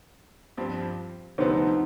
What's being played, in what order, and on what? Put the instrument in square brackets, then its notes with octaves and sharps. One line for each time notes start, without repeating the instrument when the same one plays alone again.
[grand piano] G2 F3 C4 G4
[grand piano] D2 C3 F3 B3 [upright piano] C4 D#4